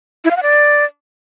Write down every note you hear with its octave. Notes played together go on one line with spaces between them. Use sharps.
E4
F5
F#5
D5